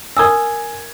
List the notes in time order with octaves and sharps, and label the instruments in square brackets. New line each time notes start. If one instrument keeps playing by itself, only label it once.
[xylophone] A#4 D#6 E6 [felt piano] G#5 G#6